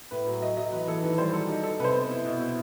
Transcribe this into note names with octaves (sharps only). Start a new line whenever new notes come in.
A2 B4
F#3
F#3 D#5
F#3 D#5
E3 B4
E3 A4
D#3 B4
G3 C5
F#3 A4
D#4
D#4 A4
C3 B4 C5
B3
E4
B2
E4